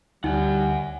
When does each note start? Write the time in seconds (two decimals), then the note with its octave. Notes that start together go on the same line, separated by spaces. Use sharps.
0.24 D2 G3 D#4 F#5 G#5